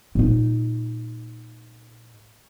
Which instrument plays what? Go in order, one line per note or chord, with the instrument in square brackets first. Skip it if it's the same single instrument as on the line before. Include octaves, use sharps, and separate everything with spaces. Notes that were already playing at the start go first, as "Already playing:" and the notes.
[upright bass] A#2 D#4